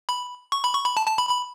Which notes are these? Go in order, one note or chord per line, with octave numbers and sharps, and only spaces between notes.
B5
C#6
B5
C#6
B5
A5
A5
B5
B5